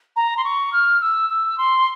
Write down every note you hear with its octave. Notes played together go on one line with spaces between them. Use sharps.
A#5
C6
C#6
F6
E6
E6
C6